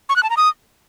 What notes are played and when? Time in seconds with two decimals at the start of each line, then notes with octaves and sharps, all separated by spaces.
0.09 C#6
0.16 F#6
0.23 A5
0.30 A#5
0.37 D#6